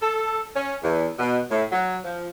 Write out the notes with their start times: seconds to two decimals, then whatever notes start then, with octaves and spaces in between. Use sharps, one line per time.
0.02 A4
0.56 C#4
0.82 E2
1.19 B2
1.51 A2
1.72 F#3
2.05 F3